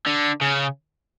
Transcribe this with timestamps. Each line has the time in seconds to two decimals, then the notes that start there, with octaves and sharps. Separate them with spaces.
0.07 D3
0.41 C#3